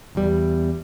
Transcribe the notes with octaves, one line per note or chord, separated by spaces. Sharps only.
E2 G3